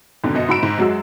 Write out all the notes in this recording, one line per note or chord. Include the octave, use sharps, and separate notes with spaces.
F2 G#2 B2 D3
F#2 B2 D#5 C#7
G#2 F#4 B5 E6 D7 E7
G#2
F#2 F#3 G#3 F#4 E6